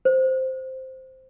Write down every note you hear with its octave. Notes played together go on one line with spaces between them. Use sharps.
C5